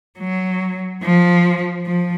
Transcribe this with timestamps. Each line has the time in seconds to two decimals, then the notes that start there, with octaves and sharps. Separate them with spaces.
0.19 F#3
1.03 F3
1.86 F3